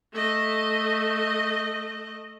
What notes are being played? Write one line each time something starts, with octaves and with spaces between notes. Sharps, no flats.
A3 D#5